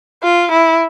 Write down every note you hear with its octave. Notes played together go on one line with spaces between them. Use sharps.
F4
E4